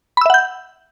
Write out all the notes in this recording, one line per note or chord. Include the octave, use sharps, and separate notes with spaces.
E5 F#5 B5 E6 G6